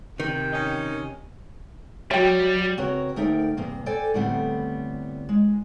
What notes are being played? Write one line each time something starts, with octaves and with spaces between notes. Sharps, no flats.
C3 D#3 G5
C#4 D#4
F#3 G3 F#4 C#5 E5 G5
C#3 C4 F#4 A#4 B4 C#5
D2 D#4 A#4 D5 E5 G5
E2 G2 C3 A#3
A4 C5 D5 G5 G#5
A2 D3 G3 B3 C4
G#3